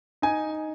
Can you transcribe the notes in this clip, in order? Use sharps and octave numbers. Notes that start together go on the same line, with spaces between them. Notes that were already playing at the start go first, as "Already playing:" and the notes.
D#4 G#5